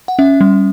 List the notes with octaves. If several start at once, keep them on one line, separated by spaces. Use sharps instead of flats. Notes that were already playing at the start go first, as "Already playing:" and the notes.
F#5
C#4 E5
G3